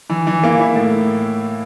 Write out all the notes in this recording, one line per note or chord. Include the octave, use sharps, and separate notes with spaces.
E3
E3
A#3
E4
A2